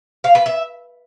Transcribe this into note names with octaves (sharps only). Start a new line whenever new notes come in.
F5
B4
E5